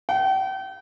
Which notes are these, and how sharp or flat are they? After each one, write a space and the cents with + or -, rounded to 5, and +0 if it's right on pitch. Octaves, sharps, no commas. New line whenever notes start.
G5 -40